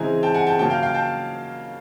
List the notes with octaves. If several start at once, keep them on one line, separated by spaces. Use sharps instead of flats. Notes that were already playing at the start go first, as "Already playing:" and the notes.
Already playing: C#3 E3 G#3 C4 E4 G#5 A#5
G5 A5
F#5 G#5
G5 A5
C#3 F#3 A#3 G5 A5
F5 G5
F5 G5
G5 A5